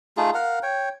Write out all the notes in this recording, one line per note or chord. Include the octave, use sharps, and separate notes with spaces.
A3 D#4 F4 G#4
A#4 F5 F#5
C#5 G5